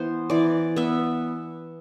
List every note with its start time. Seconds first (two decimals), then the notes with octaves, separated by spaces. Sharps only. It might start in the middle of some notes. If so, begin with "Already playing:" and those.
Already playing: E3 B3 C5
0.30 E3 D5
0.76 B3 E5